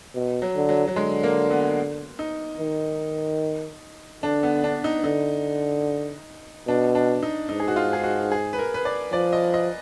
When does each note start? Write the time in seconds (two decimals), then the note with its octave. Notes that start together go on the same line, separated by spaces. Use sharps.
0.15 B2
0.42 F#3
0.56 D3
0.69 F#3
0.88 F#3
0.96 D3 G#3
1.23 A#3
1.51 B3
2.19 D#4
2.59 D#3
4.23 D3 D4
4.43 B3
4.64 D4
4.84 D#4
5.04 D3 D#4
6.67 B2 D4
6.95 D4
7.23 D#4
7.49 G#2 D#4
7.60 G#4
7.68 F#4
7.76 F4
7.93 G#4
8.04 F#4
8.32 G#4
8.53 B4
8.59 A#4
8.74 B4
8.85 D5
9.12 F3 D5
9.33 D#5
9.54 D#5